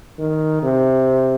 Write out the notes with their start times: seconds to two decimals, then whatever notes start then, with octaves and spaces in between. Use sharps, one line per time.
0.19 D#3
0.63 C3